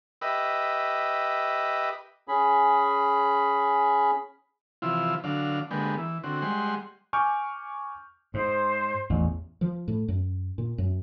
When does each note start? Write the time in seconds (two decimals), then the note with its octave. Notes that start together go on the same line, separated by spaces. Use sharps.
0.21 G4 B4 D#5 E5
2.28 C#4 G#4 B5
4.82 C3 E3 F3 E4 F4
5.24 D3 F#3 D4 F5
5.71 D3 G#3 A#3 B3 G4
5.98 E3
6.24 D3 C4 F#4
6.42 G3 G#3 F#5 C6
7.13 G#5 C#6 D6 F6 G6
8.34 G#2 C5
9.10 A1 E2
9.61 F3
9.88 A2
10.08 F#2
10.58 A#2
10.78 F#2